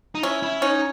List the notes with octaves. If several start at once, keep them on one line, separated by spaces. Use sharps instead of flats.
D#4
C#4 E4
E4
C#4 D#4